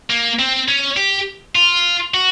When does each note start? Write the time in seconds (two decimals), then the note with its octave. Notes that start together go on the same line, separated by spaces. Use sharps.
0.10 A#3
0.39 C4
0.68 C#4
0.97 G4
1.55 F4
2.14 F#4